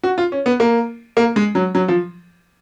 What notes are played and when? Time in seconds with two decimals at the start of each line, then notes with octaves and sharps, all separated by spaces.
0.03 F#4
0.18 F4
0.32 C#4
0.46 B3
0.60 A#3
1.17 A#3
1.36 G#3
1.55 F#3
1.75 F#3
1.88 F3